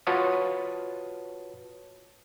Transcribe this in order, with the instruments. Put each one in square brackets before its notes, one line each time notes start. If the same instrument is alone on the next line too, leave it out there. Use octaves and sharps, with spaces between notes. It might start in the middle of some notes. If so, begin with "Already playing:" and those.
[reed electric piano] F4 F#4 B4 C#5 A5 D#6